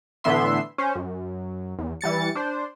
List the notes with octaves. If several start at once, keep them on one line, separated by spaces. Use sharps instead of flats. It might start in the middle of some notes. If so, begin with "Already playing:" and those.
A2 D3 E3 B3 E5 C6
C#4 C5
F#2
E2
E3 G3 A6 C#7
D4 C5